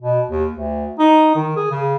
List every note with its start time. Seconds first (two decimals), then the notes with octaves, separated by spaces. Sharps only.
0.02 B2
0.30 D#2
0.53 D2
0.99 D#4
1.36 D#3
1.56 G#4
1.71 C#3